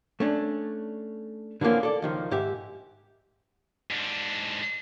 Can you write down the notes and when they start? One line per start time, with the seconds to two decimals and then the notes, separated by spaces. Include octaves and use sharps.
0.20 A3 C#4 D4
1.61 D3 E3 F3 A#3 C#4
1.83 A4 D5
2.02 C#2 D#3 F3
2.31 G#2 G4 E5
3.90 G#2 D4